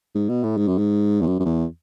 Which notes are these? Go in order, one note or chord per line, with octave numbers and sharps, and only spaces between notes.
G#2
B2
A2
G#2
F#2
G#2
E2
F#2
F#2
E2